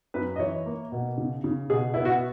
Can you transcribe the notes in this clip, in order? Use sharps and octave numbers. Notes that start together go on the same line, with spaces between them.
F#2 B4
D#5
E3 C#5
A#3
B2
C#3
C#3
B2 G#4
B3 E4
F#4